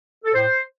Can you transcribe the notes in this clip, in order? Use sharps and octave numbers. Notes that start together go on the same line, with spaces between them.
A4
A2 C5